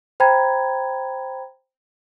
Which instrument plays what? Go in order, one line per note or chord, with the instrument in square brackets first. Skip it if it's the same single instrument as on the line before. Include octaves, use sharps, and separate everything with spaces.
[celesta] C5 G5 A#5 B5 G#6